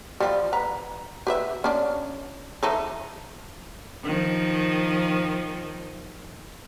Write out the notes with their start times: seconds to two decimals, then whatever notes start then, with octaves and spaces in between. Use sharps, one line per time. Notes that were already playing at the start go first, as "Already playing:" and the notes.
0.20 F3 G3
0.53 B4 A#5
1.27 G4 B4 E5
1.64 C#4 D4
2.63 E3 D#4 A4
4.04 D#3 F3